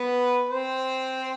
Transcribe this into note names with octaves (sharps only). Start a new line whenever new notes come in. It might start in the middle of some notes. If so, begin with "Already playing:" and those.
Already playing: B3 B4
C4 C5